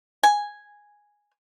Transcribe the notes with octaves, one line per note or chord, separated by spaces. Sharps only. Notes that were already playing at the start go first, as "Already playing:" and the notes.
G#5